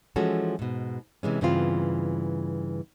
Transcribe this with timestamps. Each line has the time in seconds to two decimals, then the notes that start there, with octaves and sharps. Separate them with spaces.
0.16 E3 F3 G#3 C#4 F#4 A4
0.59 G#2 B2
1.23 C3 E3 G#3 C#4
1.41 G2 C#3 E3 B3 C4 F4